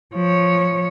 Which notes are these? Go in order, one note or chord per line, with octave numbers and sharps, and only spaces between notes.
F3 C#5